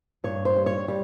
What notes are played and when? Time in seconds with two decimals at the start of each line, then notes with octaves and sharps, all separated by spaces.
0.24 G2 C#5
0.45 C5
0.56 G3
0.66 C#5
0.88 G3